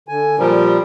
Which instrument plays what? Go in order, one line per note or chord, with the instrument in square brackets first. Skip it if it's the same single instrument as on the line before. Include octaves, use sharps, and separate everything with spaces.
[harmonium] D3 G#5
[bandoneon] A#2 F3 G3 [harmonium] A#4